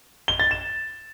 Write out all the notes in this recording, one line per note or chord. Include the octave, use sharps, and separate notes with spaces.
G7
A6
E7